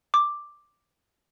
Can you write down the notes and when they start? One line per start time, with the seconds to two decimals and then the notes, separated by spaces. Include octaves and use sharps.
0.14 D6